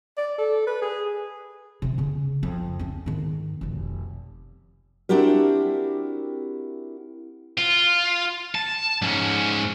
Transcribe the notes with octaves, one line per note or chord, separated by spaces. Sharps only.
D5
A4
B4
G#4
C3 F3
C#3 C#4
F2
C4 C#4
G#2 D#3
F1 B1
C4 D4 E4 F#4 G4 A#4
F4
A5
G#2 C#4